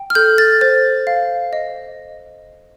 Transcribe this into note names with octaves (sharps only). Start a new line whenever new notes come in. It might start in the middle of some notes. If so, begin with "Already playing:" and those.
Already playing: G5
F6
A4 G6
A6
C5 A6
F5
D#5